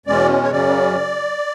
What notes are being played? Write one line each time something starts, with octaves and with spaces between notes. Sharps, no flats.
E2 B2 G#3 C#4 D5
C#5
F#2 C#3 F#3 C#4 D5